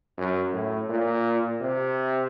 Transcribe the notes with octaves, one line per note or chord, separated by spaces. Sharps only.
F#2
A2
A#2
C3